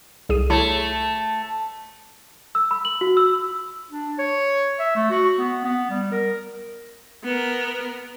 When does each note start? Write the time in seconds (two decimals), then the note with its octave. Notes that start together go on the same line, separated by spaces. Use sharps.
0.29 C2 G#4 D#7
0.50 A3 E4 C#5
2.55 E6
2.71 B5
2.85 F#7
3.01 F#4
3.17 E6
3.91 D4
4.18 C#5
4.79 E5
4.96 A3
5.11 F#4
5.39 B3
5.64 B3
5.90 G3
6.12 A#4
7.24 B3 A#4